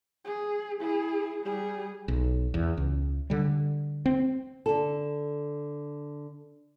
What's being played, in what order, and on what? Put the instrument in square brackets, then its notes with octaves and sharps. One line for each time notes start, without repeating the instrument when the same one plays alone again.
[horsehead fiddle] G#4
E4 G#4
G3 G#4
[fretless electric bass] B1
E2
C#2
D3 G3
C4
[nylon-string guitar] D3 A4